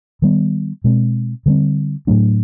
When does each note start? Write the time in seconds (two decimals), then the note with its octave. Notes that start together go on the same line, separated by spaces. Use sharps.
0.22 D#3 G3 B3
0.84 B2 G#3 C4
1.46 D3 G3 C4
2.07 A2 F#3 A3 D4